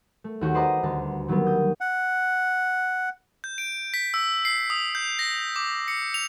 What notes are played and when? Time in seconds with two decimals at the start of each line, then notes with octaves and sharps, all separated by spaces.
0.24 A3
0.41 D#2 D#3 F#4 C#6 G6
0.54 B4 C5 D5 D#5 A5 A#5
0.83 D#1 D2 A5
1.28 D#3 F#3 G3 A#3 B3
1.46 D#6 G6
1.81 F#5
3.44 G6
3.58 D7
3.94 B6
4.14 E6
4.45 C7
4.70 D#6
4.95 G6
5.19 A#6
5.56 D6
5.88 C#7
6.14 F7